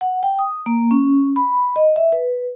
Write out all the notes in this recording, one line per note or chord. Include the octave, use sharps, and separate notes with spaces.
F#5
G5
D#6
A#3
C#4
B5
D#5
E5
B4